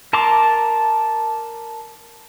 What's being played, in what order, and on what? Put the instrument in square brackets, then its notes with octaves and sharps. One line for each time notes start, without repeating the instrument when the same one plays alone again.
[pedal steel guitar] A#4 A5 A#5 C6 D6